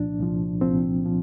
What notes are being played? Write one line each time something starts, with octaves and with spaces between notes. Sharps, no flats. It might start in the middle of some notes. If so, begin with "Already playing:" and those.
Already playing: C2 A#2 F3 D4
C2 A#2 F3
C2 A#2 F3 C4
A#2 F3